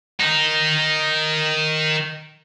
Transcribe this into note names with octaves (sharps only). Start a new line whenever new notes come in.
D#3 D#4